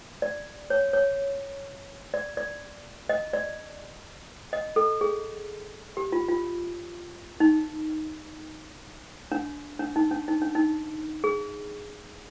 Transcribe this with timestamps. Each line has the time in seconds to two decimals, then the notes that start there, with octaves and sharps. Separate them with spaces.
0.22 D5
0.70 C#5
0.93 C#5
2.14 D5
2.37 D5
3.09 D#5
3.33 D5
4.53 D#5
4.76 A4
5.01 G#4
5.97 G4
6.12 F4
6.29 F4
7.40 D#4
9.32 D4
9.79 D4
9.96 D#4
10.11 D4
10.28 D#4
10.42 D4
10.55 D#4
11.24 G#4